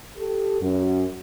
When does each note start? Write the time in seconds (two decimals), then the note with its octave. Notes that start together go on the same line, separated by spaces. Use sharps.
0.17 G4 A4
0.61 F#2